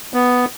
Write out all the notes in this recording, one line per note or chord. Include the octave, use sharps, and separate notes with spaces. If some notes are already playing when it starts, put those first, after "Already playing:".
B3